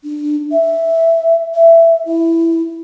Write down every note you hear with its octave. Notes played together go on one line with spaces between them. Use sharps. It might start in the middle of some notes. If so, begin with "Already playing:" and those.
D4
E5
E5
E4